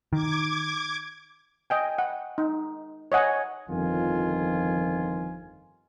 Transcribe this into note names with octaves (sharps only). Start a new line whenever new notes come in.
D#3 D6 G#6
D#5 G5 G#5
F#5
D#4
C#5 D#5 F#5 G#5
G1 F2 D#3 F3 F4 G#5